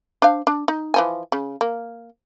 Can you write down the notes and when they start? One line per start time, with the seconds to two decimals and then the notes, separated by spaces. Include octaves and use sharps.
0.22 D4 C5 F5
0.47 D4
0.68 D#4
0.94 E3 F3 G#5
1.32 C#3
1.61 A#3